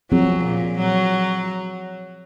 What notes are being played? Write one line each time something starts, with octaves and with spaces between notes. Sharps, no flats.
F3 F#3 C4 F4 G#4
A#2
F#3